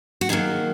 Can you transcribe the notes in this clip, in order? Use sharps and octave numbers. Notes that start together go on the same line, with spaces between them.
F#4
D#3 F#3 A#3 G#4